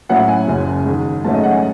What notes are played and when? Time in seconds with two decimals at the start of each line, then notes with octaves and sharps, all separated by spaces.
0.09 A2 F#3 C#4 E4 F#5
0.19 F#5
0.28 G#5
0.47 F#1 F#2 C#3 G#3
0.85 G#2 D#3 G#3
1.24 G#2 F#3 A3 C#4 A5
1.34 D#5
1.43 F#5
1.53 G#5